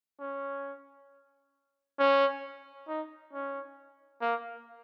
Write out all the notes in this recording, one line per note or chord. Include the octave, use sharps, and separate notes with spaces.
C#4
C#4
D#4
C#4
A#3